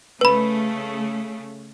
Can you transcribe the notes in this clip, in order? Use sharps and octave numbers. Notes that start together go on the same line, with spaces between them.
C#3 A3 B4 B5